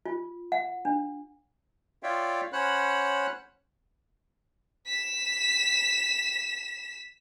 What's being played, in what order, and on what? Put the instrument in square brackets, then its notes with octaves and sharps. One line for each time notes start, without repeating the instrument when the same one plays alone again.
[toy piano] F4
F#5
D4
[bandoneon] F4 C#5 D5 E5 F5 G5
C#4 C5 C#5 F#5 B5 F#6
[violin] B6 E7